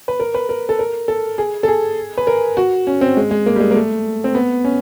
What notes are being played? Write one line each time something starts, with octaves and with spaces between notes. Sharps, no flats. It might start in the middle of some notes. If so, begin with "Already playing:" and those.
B4
A#4
B4
A#4
A4
A#4
A4
G#4
A4
G#4
B4
A#4
F#4
C#4
C4
G#3
G#3
A#3
G3
G#3
A#3
A3
C4
B3
C#4